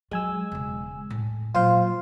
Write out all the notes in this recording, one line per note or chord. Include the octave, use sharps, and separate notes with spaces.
F#3 G#3 G#5 E6
E1 C#3
A2
A#2 F#3 F4 C5 F5